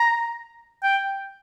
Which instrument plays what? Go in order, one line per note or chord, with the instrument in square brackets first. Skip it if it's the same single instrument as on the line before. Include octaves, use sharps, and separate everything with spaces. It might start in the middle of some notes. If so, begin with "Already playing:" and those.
Already playing: [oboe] A#5
G5